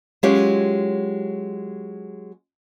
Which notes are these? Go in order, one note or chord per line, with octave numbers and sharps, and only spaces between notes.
F#3 G#3 C#4 F4 G4 C#5